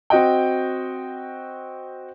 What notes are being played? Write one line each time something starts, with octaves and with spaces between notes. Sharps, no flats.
C4 F#4 D#5 G5